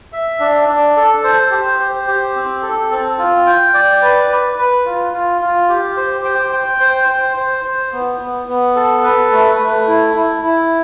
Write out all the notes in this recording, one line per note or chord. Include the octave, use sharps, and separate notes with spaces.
E5
D4
D4
A4
C5
G4
C5
G4
C4
A4
C4
F4
G5
D5
B4
B4
B4
F4
F4
F4
G4
C5
G5
G5
C5
C5
C5
C5
B3
B3
B3
A4
B4
A3
A3
E4
E4
E4